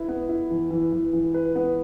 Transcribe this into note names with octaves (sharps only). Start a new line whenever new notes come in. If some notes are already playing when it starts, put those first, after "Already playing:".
Already playing: E4 B4
B3
E4
E3
E3
E3
E3
B4
B3